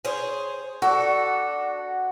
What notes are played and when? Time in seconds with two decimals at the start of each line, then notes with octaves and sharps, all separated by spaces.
0.05 G#4 C5 C#5
0.82 D4 F#4 A4